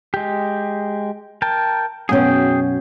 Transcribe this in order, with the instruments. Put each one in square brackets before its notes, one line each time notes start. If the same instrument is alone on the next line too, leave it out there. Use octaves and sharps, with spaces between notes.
[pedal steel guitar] G#3 G4
A#4 G5 A5
[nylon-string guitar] F#2 B2 C#4 [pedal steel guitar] G#4 G5